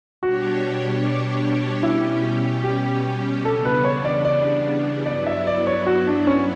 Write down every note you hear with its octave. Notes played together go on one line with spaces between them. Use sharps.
B2 G3 D4 F#4 G4 C#5
B2 G3 C#4 E4 G4
G4
E2 C#3 G3 B3 D4 A4
B4
C#5
D5
D5
G2 F#3 B3 E4 D5
E5
D5
C#5
F#4
D4
C#4